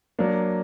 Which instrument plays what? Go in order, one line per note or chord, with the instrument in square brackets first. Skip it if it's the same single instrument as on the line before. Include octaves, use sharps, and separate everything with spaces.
[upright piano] F#3 A#3 D4